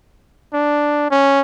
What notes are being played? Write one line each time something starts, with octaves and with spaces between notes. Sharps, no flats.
D4
C#4